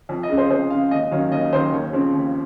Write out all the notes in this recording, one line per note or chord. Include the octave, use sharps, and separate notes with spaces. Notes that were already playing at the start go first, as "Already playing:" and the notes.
F2
D#5
C#3 G#3
C5
F2 C5
C#3 G#3 F5
D#2 D#5
D#3 F#3 C#4 F5
D#2 D#5
D#3 F#3 C#4 C5
D#2 C#5
C#3 F3 C4
D#2